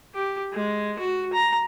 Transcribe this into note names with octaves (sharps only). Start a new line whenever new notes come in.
G4
G#3
F#4
A#5